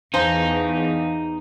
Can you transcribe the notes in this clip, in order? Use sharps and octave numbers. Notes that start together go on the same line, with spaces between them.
E2 D#4 C5 F5 G#5 A5